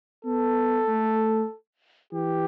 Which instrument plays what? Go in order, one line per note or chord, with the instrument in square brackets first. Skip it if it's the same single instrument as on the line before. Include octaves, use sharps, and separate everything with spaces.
[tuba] B3 [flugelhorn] A4
[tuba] A3
[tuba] E3 [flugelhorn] G4